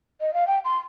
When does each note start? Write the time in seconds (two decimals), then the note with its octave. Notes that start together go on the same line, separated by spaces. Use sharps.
0.21 D#5
0.34 F5
0.47 G5
0.65 C6